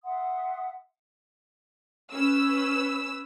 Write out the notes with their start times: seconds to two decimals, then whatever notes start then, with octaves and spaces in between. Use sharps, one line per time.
0.04 E5 F#5 C6 D#6
2.13 C#4 B4 E6